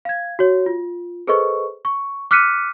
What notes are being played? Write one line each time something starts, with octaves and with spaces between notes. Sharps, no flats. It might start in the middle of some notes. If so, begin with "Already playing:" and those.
F5 G#6
F#4 C#5
F4
G#4 A4 B4 C5 D#5 C#6
C#6
D6 F6 F#6 B6 C#7 D#7